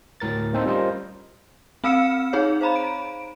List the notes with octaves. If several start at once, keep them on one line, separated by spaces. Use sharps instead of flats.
D2 A2 A#4 A6
A3 A#3 C4 D#4 A4 C5
G3 C#4 F4 A#4 C5 D#5
C4 F5 E6 F6 C#7 E7
D#4 G#4 C#5
C5 F5 A#5 B5
D7